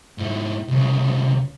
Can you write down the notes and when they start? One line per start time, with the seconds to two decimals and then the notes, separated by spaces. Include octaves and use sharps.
0.18 G#2 E4
0.68 C2 C#3